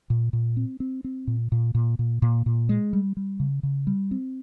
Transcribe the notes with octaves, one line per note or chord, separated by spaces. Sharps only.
A#2
A#2
C4
C4
C4
A#2
A#2
A#2
A#2
A#2
A#2
G#3
G3
G3
C#3
C#3
G3
C4